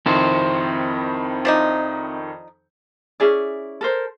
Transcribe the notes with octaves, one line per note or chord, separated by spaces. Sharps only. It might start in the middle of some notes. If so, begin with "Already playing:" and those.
F2 D#3 C4 E4 C5
F3 D4 D#4
C#4 E4 G#4 D5
A4 A#4 C5